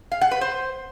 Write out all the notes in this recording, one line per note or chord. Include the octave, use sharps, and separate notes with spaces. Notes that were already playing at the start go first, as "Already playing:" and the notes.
F5
F#5
B4
C5